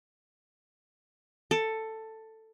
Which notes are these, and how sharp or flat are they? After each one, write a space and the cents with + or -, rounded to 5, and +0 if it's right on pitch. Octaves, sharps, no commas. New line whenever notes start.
A4 +10